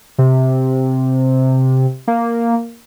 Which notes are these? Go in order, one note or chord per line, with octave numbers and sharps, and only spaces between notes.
C3
A#3